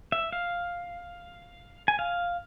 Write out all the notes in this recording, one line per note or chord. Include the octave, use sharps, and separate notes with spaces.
E5
F5
G#5
F5